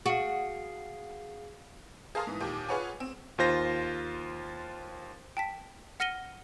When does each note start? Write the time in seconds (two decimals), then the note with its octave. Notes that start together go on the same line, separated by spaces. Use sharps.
0.06 F#4 G#4 F5
2.15 G#4 A#4 F5 A5 C6 D#6
2.27 G#2 E3
2.40 D#2 A#2 G4
2.68 F4 G#4 B4 C#5 F#5 G#5
3.00 C4
3.38 D#2 F4 C5 A#6
5.37 G5 A5 B6
6.00 F#5 F6 A#6 C#7 D#7 G7